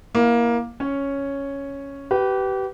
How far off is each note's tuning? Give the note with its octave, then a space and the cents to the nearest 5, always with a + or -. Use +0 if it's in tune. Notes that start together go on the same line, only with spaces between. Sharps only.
A#3 +15 E4 +0
C#4 +0 C#5 +0
G4 -30 B4 +0